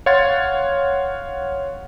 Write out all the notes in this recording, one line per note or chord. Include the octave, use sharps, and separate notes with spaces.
C#5 F5 F#5 C6 G#6 A6